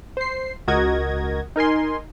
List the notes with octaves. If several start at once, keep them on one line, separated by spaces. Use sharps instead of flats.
C5 C7
C#2 F#4 A#4 D#5 G#6 A#6
D#4 A#4 G#5 C6